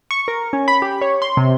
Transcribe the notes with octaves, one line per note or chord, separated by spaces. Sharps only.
C#6
A#4
C#4
B5
G4
C#5
C6
C3